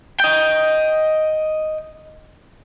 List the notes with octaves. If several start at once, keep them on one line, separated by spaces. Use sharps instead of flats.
D#5 G5